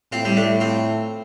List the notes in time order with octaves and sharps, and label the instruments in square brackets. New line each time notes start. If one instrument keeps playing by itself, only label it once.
[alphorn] A2 [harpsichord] C4 F4
[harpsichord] G3 C4
A3 D4
C4 F4